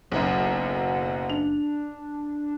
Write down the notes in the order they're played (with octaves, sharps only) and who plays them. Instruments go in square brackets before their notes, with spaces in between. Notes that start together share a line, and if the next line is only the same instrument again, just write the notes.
[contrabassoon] F#1 [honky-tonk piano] B1 F#2 [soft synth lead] F#5
[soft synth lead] D4 [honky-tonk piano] F7